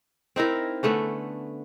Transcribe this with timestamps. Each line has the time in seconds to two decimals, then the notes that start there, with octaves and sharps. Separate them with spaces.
0.36 C4 D#4 E4 A#4
0.83 D3 A3 B3 C#4